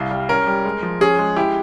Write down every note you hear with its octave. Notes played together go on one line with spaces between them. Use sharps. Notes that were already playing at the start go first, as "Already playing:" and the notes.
Already playing: C2 F5
G3
C#4 A#4
G3
G#3
F3
C#4 G#4
G#3
E4 G4